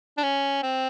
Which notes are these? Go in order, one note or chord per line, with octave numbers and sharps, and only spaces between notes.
D4
C#4
C4